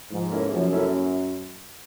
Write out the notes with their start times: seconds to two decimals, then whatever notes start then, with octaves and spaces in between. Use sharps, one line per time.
0.11 G#2 F3
0.31 A#3 C#4 E4 A4
0.52 F#2 F3
0.72 A#3 C#4 E4 A4